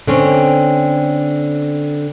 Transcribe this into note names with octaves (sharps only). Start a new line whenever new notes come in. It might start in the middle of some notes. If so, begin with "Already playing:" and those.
D3 C4 C#4